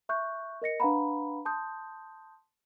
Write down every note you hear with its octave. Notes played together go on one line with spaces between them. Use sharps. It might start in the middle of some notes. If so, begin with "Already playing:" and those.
E5 C#6 F#6 G6
A#4 D#5 A#6 C#7
D4 B4 F5 F#5 A#5 B5
A5 C6 D#6 G6